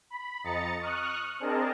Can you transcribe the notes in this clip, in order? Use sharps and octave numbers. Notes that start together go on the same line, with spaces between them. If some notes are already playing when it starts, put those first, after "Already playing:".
B5
F2 D#5 A#5 A6 C#7
C#6 D#6 F6 F#6
C4 D4 G#4 A#4 D#5 A5